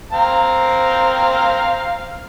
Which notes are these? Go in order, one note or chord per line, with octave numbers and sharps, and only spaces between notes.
C4 F5 A#5